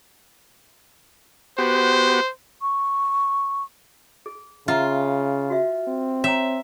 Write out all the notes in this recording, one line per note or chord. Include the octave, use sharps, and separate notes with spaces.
B3 F#4 G4 C5
C#6
G#4
C#3 F4 E5 F#5 A#5
F#4 E5
C4
C#5 E5 G5 A#5